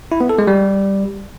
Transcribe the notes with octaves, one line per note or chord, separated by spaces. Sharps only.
E4
B3
A4
G#3
G3